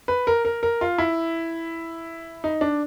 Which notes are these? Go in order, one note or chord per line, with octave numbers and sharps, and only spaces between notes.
B4
A#4
A#4
A#4
F4
E4
D#4
D4